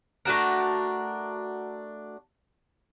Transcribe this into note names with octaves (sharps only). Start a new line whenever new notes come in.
A3 D4 F#4 A#4